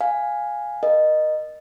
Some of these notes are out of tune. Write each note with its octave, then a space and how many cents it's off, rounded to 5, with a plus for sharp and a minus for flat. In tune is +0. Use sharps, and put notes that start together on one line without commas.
F5 +10 G#5 -5
A#4 +25 D#5 -15